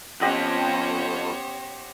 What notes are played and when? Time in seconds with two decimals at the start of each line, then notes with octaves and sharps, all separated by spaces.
0.21 F2 B3 C#4 G4 C5 C#5 D#5 F#5